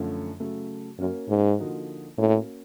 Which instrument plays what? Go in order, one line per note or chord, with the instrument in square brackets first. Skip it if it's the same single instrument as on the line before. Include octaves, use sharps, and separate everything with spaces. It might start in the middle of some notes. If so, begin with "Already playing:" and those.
Already playing: [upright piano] F#2 D3 F3 A3 C#4
C#3 F#3 A3
[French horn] F#2 [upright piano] A#3 C#4 F#4 A#4
[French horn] G#2
[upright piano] D3 F3 A#3 D#4 F#4
[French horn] A2 [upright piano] A#3 C#4 F#4